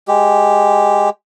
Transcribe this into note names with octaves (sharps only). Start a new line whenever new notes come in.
G#3 G4